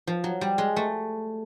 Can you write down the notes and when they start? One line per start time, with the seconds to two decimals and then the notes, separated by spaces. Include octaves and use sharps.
0.07 F3
0.24 F#3
0.41 G3
0.58 G#3
0.76 A3